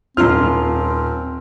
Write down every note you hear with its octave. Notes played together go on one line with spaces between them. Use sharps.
D#1 D#2 C4 F4 C6 F6